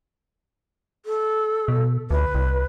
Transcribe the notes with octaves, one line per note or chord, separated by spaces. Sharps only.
A4
B2
D2 B4
C2